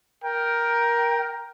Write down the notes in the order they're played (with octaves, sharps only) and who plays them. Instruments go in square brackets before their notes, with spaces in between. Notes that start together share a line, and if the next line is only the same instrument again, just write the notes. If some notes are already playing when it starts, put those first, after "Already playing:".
[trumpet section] A#4 G5